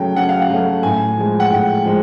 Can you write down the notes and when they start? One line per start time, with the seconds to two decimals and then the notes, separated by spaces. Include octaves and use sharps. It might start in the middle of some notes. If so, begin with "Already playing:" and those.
Already playing: C#3 F#3 A3 G5
0.16 C#3 F#5
0.29 F5
0.42 F#5
0.50 F#3 A3
0.83 A2 G#5
1.17 F3 G#3
1.40 F#5
1.50 A2 G5
1.84 F3 G#3